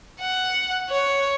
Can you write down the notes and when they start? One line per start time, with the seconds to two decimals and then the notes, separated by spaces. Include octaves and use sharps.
0.20 F#5
0.89 C#5